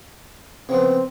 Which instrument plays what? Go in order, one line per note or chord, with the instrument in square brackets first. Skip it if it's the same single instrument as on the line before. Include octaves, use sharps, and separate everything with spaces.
[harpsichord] C#3 F3 B3 [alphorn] C4